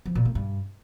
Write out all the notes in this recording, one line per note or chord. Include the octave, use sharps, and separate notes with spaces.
F3
A#2
A#3
G2